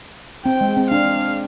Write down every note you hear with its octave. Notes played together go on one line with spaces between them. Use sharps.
C4 G5
G#3
C4
D4 F5